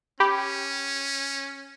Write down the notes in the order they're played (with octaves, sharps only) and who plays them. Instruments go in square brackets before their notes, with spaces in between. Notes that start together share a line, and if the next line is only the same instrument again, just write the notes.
[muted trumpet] C#4 [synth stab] G4 [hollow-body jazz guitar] B5